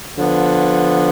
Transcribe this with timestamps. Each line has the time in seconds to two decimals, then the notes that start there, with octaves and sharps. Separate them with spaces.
0.17 D3 F3 B3